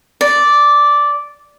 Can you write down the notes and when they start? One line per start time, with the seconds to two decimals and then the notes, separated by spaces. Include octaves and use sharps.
0.21 D5